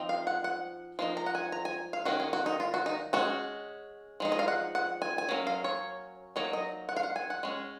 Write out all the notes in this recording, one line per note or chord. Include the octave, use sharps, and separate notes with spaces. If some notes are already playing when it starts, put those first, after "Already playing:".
Already playing: F3 C4 D#4
F5
F#5
F#5
F3 A#3 D#4
A#5
F#5
G#5
A#5
G#5
F5
D#3 A#3 C#4 F#4
G#4
F#4
D#4
F4
F#4
D#4
G#3 C#4 F#4
F3 G#3 D#4
D#5
F5
F#5
F#5
G#5
G#5
F#3 A#3 C#4
F5
C#5
F#3 A#3 D#4 C#5
D#5
F#5
F5
F#5
G#5
F#5
G#3 C#4